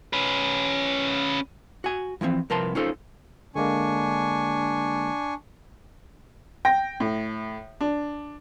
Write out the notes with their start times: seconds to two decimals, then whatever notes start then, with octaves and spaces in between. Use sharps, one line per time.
0.13 C#4 B4
1.84 F#4 G#5
2.21 E3 F3 G#3 C4
2.50 C2 F3 A#4 B4 A5 C6
2.75 C#4 D#4 F4 A4 C5
3.55 D3 G#3 A#3 D4 G#5 C#6
6.65 G5 A#6
7.00 A2
7.81 D4